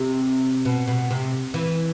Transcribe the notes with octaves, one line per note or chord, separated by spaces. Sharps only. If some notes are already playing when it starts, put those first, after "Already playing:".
Already playing: C3
B2
B2
C3
E3